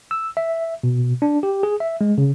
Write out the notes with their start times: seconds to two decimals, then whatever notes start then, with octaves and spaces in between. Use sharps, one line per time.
0.11 E6
0.37 E5
0.83 B2
1.22 D4
1.43 G4
1.63 G#4
1.80 E5
2.01 G#3
2.18 C#3